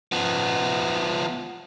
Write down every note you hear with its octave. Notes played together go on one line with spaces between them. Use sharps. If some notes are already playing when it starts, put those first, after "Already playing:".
F3 B3